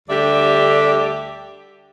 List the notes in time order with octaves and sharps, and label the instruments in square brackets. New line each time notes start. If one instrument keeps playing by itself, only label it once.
[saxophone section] D2 D3 G3 D4 G4 E5